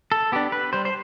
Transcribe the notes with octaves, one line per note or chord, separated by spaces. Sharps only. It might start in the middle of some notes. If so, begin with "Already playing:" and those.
A4
B3 D4 G4
B4
G3 C5
C5